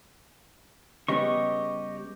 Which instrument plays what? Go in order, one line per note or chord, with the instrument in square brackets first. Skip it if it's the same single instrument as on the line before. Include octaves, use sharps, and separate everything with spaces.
[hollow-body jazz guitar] C#3 G3 B3 [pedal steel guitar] G4 D#5 C#6